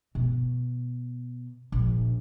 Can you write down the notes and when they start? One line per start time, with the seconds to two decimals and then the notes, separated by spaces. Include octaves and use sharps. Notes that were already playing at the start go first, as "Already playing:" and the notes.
0.15 B2
1.72 A#1